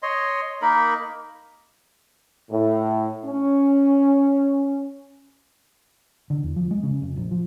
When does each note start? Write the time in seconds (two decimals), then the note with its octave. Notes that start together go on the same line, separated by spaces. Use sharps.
0.03 C#5 D#5 C6
0.62 A#3 D#4 A#4 B5
2.51 A2
3.25 C#4
6.30 D3
6.43 E2
6.56 F3
6.71 G#3
6.83 C#3
7.02 F1
7.16 A#1
7.31 F3